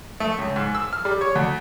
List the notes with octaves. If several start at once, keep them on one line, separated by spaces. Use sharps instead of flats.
A3
C#2
G#2
E6
F6
G3
C#5
D2